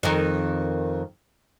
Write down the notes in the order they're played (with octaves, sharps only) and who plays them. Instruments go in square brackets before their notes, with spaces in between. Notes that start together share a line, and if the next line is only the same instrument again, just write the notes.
[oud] F2 D#3